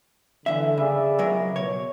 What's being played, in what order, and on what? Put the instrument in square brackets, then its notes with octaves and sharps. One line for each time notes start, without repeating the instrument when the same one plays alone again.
[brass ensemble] D3 [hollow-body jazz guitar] E3 E5
[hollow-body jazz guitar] C#3 [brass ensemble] G#4 D5 E5
[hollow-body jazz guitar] C#2 F#3 A#4
[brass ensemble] B2 [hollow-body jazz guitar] C#5